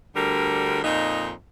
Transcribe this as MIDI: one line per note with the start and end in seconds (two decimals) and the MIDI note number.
0.15 0.78 38
0.15 0.78 50
0.15 0.78 55
0.15 0.78 70
0.82 1.31 41
0.82 1.31 46
0.82 1.31 63